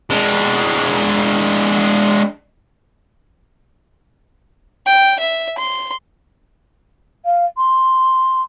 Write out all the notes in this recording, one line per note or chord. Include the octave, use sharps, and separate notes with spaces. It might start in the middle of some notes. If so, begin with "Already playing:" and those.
G#3 D4
G5
E5
C6
F5
C6